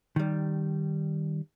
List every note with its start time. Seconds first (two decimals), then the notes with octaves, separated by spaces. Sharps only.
0.16 D#3 G3